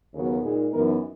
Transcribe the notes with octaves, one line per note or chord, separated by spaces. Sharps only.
D#2 C#3 F#3 B3
A#2 G#3 D#4 G#4
F#2 E3 B3 D#4 A#4